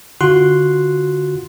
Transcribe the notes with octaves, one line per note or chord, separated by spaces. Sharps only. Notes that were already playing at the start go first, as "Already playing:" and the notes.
D3 F4 F#4 C6 F#6